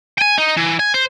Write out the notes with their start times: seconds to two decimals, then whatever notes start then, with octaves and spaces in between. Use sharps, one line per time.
0.18 G5 G#5
0.38 D#4
0.57 E3
0.79 G#5
0.94 C5